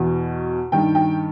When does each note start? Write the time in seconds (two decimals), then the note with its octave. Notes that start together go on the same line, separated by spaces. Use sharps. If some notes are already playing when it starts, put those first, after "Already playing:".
Already playing: E2 B2
0.72 G2 D#3 G5
0.95 G5